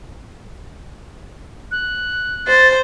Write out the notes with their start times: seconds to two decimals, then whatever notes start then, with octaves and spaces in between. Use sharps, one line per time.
1.71 F#6
2.47 C5 A6